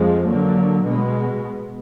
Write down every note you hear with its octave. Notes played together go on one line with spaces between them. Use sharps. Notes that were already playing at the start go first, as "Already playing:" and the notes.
Already playing: F2 F3 G#3
D3 F#3 A#3
B2 G#3 B3